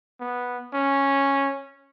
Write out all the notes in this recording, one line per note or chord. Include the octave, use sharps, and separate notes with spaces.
B3
C#4